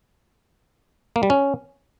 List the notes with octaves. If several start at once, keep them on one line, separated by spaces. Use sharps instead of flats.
A#3
G3
C#4